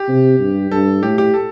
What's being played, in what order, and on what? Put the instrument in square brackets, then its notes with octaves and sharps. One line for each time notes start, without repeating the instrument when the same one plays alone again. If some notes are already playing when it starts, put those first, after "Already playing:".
Already playing: [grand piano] G4
[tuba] C3
G2
[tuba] G2 [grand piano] A4
[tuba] A2 [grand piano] G4
[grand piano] G4
A4